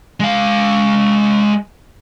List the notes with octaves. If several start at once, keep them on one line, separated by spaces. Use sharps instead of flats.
G#3 F5